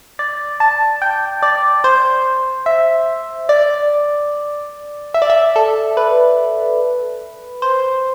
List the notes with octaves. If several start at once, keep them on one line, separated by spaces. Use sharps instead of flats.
D5
A5
G5
D5
C5
E5
D5
E5
D5
E5
A4
B4
C5